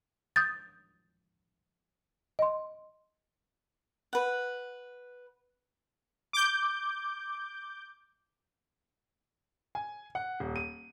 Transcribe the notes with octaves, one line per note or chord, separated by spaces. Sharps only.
D#6 G6 A6
D#5 C6
B4 F#5
D6 G6
G#5
F#5
D#1
D#7